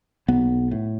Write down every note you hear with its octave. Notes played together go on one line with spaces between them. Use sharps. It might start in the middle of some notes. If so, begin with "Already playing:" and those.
B1 B3
A2